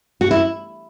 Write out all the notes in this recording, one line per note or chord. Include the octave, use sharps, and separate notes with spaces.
F#4
E4